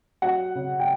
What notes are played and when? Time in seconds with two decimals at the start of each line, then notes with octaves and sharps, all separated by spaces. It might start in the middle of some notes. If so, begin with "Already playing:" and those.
0.22 F#3 F#5
0.55 C#3
0.80 G5